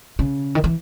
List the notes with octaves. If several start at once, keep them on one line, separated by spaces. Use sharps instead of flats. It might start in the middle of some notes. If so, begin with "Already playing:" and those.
C#3
D#3
E3